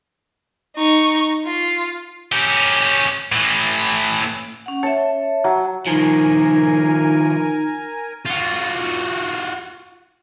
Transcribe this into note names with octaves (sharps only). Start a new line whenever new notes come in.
D#4 C#6
F4
C#4 G4
A2 E3
C#4 F#5
C#5 E5 A5
F#3
D#3 F3 D#4 A#4 G#5
F4 F#4